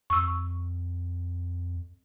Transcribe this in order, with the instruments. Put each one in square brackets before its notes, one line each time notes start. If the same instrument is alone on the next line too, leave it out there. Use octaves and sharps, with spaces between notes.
[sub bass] F2 [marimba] C#6 E6